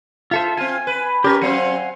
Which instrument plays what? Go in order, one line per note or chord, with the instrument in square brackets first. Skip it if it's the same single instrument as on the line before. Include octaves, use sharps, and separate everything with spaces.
[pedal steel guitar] F4 A4 C5 [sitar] E5
[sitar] C4 F4 [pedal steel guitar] G#5
[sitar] B4
[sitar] C#4 [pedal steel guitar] G4 A#4 B4
[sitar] F#3 C4 [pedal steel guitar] F5 F#5 G#5